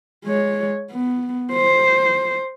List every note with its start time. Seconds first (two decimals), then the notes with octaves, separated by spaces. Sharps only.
0.25 G#3 C#5
0.92 B3
1.53 C5